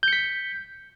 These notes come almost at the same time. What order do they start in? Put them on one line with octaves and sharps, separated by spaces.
G6 C#7 B6